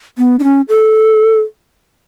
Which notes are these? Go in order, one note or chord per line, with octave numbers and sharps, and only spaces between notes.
B3
D4
C#4
A4